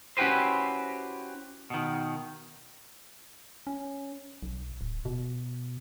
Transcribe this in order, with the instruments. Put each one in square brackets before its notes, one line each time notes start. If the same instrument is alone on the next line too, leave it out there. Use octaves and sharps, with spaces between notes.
[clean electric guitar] C#4 E4 F#4 G4 B4 C5
B2 D#3
[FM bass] C#4
B1
D1
B2